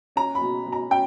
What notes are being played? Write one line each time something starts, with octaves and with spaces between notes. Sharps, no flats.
C#4 A#5
B5
B2
B2
A#5
C#4 G5